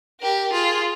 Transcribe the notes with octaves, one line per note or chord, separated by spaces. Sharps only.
G4 A#4
F4 G#4